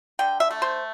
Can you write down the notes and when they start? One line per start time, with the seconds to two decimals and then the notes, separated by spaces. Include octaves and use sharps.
0.19 D3 G5
0.40 E5
0.51 A3
0.62 C5